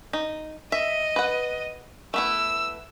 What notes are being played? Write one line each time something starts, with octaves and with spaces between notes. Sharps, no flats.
D#4
D#5 E5
B4 F#5
A3 B3 E4 E6